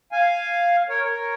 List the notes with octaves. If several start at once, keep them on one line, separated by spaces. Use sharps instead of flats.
F5 G#5
A#4 C#5
A#4 C#5